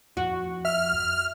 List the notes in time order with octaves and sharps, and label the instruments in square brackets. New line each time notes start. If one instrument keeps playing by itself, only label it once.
[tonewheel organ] F2 [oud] F#4
[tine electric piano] E5 [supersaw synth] F6